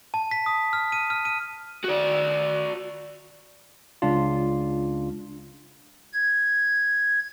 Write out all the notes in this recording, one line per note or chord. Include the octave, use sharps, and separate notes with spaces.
A5
B6
D#6
F6
D#7
F6
D#7
F#4 D5
C#2 D4 F4
G#6